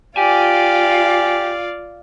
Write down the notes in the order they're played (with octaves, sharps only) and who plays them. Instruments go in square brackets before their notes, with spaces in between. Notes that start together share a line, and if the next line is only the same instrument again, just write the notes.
[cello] F4 [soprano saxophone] G4 [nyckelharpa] D5 F5 [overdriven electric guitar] G#5